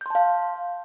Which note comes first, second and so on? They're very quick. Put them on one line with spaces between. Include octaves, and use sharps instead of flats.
G6 C6 A5 F5